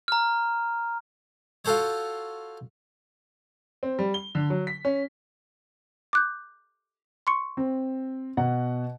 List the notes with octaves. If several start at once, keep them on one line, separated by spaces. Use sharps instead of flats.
A#5 F6
F4 F#4 A4 C5 C#5
C4
G3
G7
D3
F#3
B6
C#4
D6 F#6 G6
C6 C#6 C#7
C4
B2 F#5